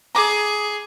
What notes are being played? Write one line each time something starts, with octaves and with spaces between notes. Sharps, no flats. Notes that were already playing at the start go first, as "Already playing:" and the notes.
G#4 A#5 D6